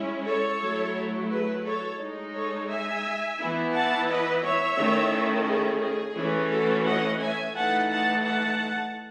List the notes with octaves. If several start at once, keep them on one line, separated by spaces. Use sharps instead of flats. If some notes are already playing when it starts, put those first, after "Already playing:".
Already playing: G#3 C#4 E4
A4 C#5
F#3 A3 E4
G#4 B4
A4 C#5
G#3 D#4
A4 C#5
E5 G#5
E3 B3 E4
F#5 A5
B4 D#5
C#5 E5
D#3 A3 C#4 E4
G#4
G#4
E3 A3 C#4
F#4 A4
D#5 F#5
E5 G#5
E3 A3 D#4 F#5 A5
F#5 A5
F#5 A5